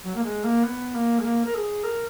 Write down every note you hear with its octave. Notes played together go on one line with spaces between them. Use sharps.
F#3
A#3
G#3
A#3
B3
A#3
G#3
A#3
A#4
G#4
A#4